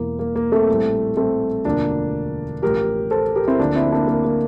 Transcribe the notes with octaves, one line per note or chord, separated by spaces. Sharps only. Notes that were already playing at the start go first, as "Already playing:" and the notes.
Already playing: E1 E2 E3 A#3
A#3
A#3
A3 C4
A#1 A2 G3
A3 C4
E1 D2 D3 F3 A#3 D4
A1 A2 F3 G4 A#4
A4 C5
G4 A#4
C4 E4
D2 D3 F3 A#3 D4
C4 E4
A#3 D4
A#3
A#3